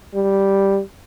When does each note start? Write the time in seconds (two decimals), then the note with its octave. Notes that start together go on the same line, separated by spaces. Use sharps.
0.14 G3